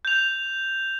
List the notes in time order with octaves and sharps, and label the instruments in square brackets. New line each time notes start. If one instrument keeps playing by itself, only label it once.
[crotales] G6 F7